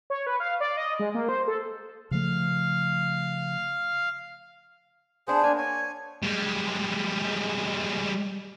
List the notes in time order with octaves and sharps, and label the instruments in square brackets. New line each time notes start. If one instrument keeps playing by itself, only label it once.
[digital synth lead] C#5
B4
F5
D5
D#5
G#3
A#3
C5
A4
[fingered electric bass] C#3 F3 A3 [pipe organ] F5
[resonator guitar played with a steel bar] B3 D4 [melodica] G#4 C5
[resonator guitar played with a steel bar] A#3 [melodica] D4 G#5
[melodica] C#5 G#5
[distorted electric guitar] G3 G#3